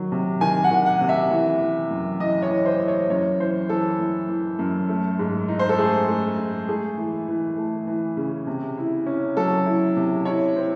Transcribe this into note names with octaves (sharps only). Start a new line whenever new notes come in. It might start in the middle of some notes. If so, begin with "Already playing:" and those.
Already playing: D#3 F#3
C3
D#3 G#5
F#5
D#3
F#5
C3
E5
E3
E3
F#2
E3 D#5
C#5
E3
C5
E4
C#5
F#2 C#5
E3 C5
E3 A4
E3
E3
F#2
A3
G#2
D#4
C5
A4
A3 G#4
A3
G#2
A3 G#4
E3
E3
A3
E3
C#3
C3
E4
C#4
F#3 A4
E4
C3
E4 C#5
C4